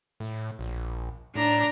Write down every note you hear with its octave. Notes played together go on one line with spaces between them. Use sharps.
A2
A#1
A2 D4 A#5